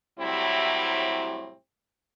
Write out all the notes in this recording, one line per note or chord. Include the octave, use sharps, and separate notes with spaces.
A2 C3 F#3 G3 C4 E4